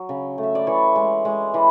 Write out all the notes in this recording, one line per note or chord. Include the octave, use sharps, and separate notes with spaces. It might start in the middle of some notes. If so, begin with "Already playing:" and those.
Already playing: F#3
C#3
A3
E5
D5
E3 C#5
G#3
G#3
E3 B4